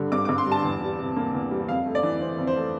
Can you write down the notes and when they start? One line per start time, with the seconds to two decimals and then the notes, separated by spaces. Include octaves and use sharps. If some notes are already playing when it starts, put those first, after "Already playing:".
Already playing: G2 D3 G3
0.12 G2 D6
0.25 D6
0.29 G2
0.38 C6
0.46 G3
0.52 A5
0.64 E2
0.81 G3
0.99 C3
1.16 A#3
1.34 E2
1.51 G3
1.68 F2 F5
1.86 A3
1.95 D5
2.03 E3
2.21 C4
2.38 F2
2.47 C5
2.56 A3